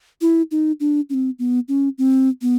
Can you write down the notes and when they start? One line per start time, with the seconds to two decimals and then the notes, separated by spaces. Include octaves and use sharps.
0.21 E4
0.51 D#4
0.80 D4
1.10 C#4
1.14 C4
1.39 B3
1.68 C#4
1.98 C4
2.42 B3